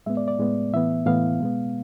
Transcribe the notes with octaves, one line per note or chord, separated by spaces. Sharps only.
A2 G#3 B3 E5
D5
D5
A2 G#3 B3
A2 E3 B3 E5
A2 E3 B3 F5
B2 G#3 B3